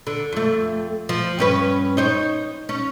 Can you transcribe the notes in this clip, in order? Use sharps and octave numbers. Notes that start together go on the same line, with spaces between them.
D3
F2 A3
F3
G2 C#4 B4
D#4 C5 C#5
C#4